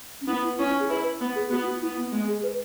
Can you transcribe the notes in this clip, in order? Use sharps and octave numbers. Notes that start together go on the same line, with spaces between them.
C#4
B3 E4
E4
C#4 E4
E4
G#4
E4 B4
B3
G#4
B3 F#4
E4
F#4
B3 E4
B3
G#3 B3
G#4
B4